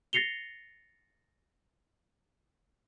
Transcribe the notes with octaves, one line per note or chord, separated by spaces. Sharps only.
A6 A#6 C7 C#7 F7 G7